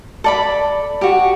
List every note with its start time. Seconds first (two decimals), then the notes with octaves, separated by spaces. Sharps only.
0.24 A4 D5 B5
1.01 F#4 G4